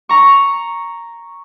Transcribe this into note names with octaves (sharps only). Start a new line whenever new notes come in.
A#5 C#6